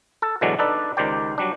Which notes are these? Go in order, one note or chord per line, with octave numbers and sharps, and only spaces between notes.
A4
B2 D3 E3 F#3 G#3 D4
D4 D#4 A4 B4 D5
C#2 D#3 G4 C5 D5 G5
F#3 G3 D4